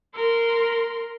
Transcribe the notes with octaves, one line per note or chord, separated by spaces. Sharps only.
A#4 C6